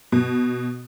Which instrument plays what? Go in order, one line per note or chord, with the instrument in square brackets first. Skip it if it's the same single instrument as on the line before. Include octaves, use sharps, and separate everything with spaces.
[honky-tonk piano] B2